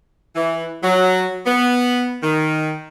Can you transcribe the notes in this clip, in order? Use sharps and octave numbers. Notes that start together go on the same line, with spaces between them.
E3
F#3
B3
D#3